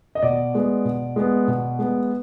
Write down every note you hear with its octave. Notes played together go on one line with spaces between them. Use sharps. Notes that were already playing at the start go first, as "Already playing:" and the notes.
D#5
B2 D5
G#3 B3
B2
G#3 B3
B2
G#3 B3